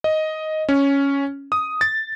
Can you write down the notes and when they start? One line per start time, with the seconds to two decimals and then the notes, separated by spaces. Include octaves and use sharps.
0.04 D#5
0.69 C#4
1.52 D#6
1.81 A6